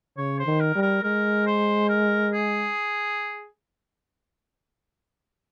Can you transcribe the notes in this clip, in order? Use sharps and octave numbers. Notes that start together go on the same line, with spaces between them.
C#3 C#5
C5
D#3
A#4
G3
A#4
G#3 A#4
C5
A#4
G#4